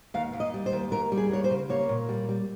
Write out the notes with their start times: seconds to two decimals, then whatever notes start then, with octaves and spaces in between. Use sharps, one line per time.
0.14 D#2 F5
0.33 D#2
0.40 D#5
0.54 G3
0.66 C5
0.73 D#2
0.92 D#2 A#4
1.12 G3
1.17 G#4
1.31 D#2 C#5
1.44 C5
1.50 C#3
1.70 A#3 C#5
1.89 A#2
2.09 G3
2.29 G3